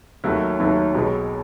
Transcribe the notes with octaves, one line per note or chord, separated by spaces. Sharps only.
D#2 D#3 F#3 A3
D#2 D#3 F#3 A3
B1 B2 G#3